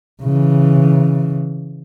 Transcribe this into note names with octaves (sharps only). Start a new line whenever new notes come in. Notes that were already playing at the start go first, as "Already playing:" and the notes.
C#3 E3